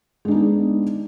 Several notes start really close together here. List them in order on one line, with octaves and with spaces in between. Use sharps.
G#3 D4 D#4 B3